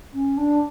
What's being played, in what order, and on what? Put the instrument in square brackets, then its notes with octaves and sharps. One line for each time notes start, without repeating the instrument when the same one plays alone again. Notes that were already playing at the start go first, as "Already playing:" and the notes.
[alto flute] C#4
D4